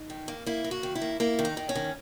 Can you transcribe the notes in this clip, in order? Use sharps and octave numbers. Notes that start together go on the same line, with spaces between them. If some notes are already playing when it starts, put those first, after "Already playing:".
Already playing: D#4
D#3
A#3
A#3 E4
A#3
F#4
D#3
E4
A#3
A#3 E4
D#3
D#4
D#3
C#4
D#3